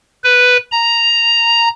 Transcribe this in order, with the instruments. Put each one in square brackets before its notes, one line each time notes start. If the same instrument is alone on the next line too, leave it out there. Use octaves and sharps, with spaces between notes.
[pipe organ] B4
A#5